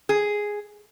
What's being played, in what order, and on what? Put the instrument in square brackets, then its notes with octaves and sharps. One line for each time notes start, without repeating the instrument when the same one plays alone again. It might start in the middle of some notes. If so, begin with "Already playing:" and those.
[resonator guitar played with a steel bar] G#4